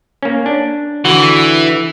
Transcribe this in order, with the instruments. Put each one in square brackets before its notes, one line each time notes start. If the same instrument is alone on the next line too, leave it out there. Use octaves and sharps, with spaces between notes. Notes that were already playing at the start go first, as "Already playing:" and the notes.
[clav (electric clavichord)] A#3 C#4
D4
[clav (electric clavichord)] D3 F#4 [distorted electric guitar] E3